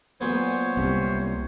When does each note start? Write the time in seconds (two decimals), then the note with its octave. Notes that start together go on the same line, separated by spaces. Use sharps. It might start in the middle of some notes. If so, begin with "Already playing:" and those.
0.21 A#2 F#3 B3 C5 C#5
0.77 C2 C3